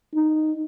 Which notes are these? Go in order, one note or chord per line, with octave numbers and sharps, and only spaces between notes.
D#4